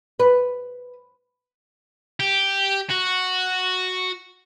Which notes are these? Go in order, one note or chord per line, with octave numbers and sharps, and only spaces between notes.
B4
G4
F#4